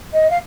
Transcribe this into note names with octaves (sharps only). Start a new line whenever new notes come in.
D#5
F5